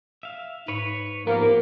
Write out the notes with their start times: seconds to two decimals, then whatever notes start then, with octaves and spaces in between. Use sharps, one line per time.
0.23 E5 F5
0.68 G#2 B4 C#5
1.27 F3 A#3 B3 G4 A#4